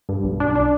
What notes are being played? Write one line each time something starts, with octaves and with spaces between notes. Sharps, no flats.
G2
B1
D4
D4